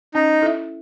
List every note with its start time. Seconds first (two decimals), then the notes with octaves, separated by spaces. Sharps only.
0.14 C#4 D#4
0.41 E4 A4 E5